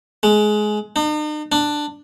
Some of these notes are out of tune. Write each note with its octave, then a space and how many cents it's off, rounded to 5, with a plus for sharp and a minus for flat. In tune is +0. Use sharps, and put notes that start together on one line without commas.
G#3 +20
D#4 -45
D4 +10